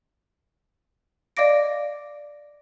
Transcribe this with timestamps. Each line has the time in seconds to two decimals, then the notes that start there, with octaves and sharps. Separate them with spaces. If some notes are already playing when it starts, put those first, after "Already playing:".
1.37 D5 D#5 F5 D6 A#6 D7